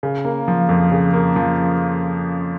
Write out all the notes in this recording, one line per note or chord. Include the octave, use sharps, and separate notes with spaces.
C#3
A#3
F3
F2
C#3
A#3
F3